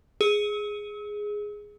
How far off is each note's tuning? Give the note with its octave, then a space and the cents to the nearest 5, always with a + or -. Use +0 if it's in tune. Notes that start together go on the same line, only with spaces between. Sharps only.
G#4 +0 E6 -40